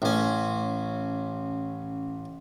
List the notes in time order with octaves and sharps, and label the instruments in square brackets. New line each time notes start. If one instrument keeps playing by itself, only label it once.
[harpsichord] A1 C#4